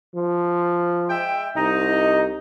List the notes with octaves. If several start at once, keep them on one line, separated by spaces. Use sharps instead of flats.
F3
G#3 E5 G5
C2 D#4 D#5